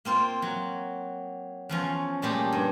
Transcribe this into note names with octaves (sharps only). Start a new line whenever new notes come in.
A#3 C4 F4
F#3
E2 F3 C#4
A#2 G3 A3 G4 G#4
G2